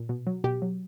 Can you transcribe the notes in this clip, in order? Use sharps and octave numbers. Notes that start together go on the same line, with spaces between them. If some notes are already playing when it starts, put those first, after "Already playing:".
Already playing: A#2
B2
F#3
B2 G4
F#3